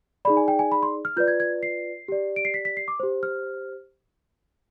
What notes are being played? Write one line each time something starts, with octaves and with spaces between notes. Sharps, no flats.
D#4 G#4 D5 B5
G#5
G5
G#5
B5
C6
F6
F4 B4 D5 G6
G#6
G#6
C7
G4 D5
D7
C7
B6
B6
C7
D6
G4 C5
F6